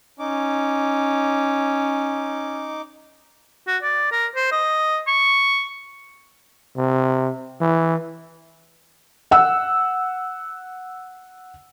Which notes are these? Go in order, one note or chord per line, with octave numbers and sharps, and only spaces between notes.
C#4 D#4 D6
F#4
D5
A#4
C5
D#5
C#6
C3
E3
F#5 E6